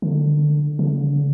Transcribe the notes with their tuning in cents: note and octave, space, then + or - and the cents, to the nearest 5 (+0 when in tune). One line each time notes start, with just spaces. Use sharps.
D3 +20
D3 -45